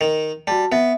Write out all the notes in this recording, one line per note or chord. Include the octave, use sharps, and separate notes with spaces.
D#3
G3 F#4 A5
B3 E5